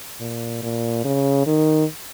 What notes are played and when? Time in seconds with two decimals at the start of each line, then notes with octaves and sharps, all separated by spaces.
0.20 A#2
0.63 A#2
1.05 C#3
1.47 D#3